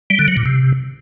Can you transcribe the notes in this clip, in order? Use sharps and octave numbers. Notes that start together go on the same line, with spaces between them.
G3
D3
F#3
A#2
C3